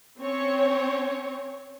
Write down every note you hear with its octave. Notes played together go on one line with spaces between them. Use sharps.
C4 C#4 C#5